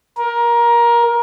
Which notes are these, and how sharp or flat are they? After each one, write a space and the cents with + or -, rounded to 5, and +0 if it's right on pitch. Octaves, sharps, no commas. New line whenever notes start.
A#4 +20